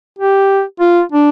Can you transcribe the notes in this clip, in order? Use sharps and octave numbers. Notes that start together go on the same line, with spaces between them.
G4
F4
D4